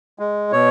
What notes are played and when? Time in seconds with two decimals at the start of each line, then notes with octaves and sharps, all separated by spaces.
0.19 G#3
0.52 B2 C#5